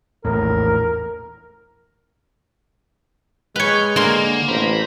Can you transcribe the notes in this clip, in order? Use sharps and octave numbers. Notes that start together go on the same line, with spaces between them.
A#1 E2 A2 A#4
G#3 B4 C#5 F6 G6
D3 A#3 A#4 G#5 C6
A1 C5 A#5 B5